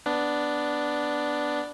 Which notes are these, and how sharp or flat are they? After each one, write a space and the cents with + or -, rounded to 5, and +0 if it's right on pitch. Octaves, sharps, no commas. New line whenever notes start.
B3 +0 D4 +0